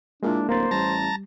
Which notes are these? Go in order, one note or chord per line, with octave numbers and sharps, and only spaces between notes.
A#2 G#3 A#3 D4 E4
D1 A#3 C5 A#5 A6
A1 G3 A5 A#5